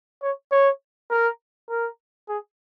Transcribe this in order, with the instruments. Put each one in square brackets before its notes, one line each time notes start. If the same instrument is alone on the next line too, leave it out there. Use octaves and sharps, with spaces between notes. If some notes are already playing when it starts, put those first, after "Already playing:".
[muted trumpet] C#5
C#5
A#4
A#4
G#4